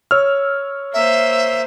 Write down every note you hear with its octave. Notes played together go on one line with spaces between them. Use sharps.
C#5 E6 F6
A#3 C5 E5